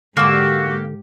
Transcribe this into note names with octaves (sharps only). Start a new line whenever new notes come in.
G#2 D3 A#3 F#4 G4 E6